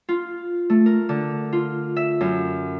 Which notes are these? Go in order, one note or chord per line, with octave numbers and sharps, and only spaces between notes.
F4
A3
A#4
D3
F4
E5
F#2